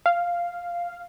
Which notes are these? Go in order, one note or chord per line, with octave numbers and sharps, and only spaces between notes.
F5